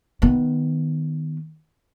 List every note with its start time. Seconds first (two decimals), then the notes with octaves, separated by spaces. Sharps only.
0.22 D#3 B3